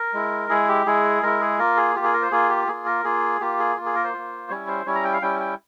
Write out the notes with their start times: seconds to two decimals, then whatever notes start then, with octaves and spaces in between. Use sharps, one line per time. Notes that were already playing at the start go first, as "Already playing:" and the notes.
Already playing: A#4
0.14 G#3 E4
0.49 G#3 E4 G#4
0.68 G4
0.86 G#3 E4 G#4
1.23 G#3 E4 A#4
1.41 G#4
1.59 A#3 F4 A#4
1.77 G#4
1.95 A#3 F4 G4
2.04 G#4
2.13 A#4
2.22 C5
2.32 A#3 F4 G#4
2.49 G4
2.68 A#3 F4 G#4
2.86 A#4
3.04 A#3 F4 G#4
3.40 A#3 F4 G4
3.59 G#4
3.76 A#3 F4
3.86 G#4
3.95 A#4
4.04 C5
4.13 A#3 F4
4.50 G3 C#4 E4 C#5
4.68 C5
4.86 G3 C#4 E4 C#5
4.95 A#5
5.04 G5
5.13 F5
5.22 G3 C#4 E4 G5
5.40 G5